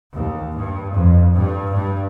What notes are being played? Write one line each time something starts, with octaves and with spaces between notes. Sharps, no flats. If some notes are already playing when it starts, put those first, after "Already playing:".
D#2
G2
F2
G2
G2